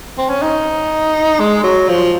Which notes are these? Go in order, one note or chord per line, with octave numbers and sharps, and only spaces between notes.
C4
C#4
D#4
G#3
F#3
F3